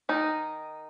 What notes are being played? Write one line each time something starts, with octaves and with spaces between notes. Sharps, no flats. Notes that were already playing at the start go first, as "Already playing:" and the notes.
D#3 D#4